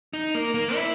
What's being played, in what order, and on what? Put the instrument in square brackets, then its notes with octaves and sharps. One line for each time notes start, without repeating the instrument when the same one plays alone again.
[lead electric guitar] D#4
A#3
A#3
E4